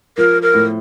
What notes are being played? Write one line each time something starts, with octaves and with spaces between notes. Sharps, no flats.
F3 A#4
A#4
A2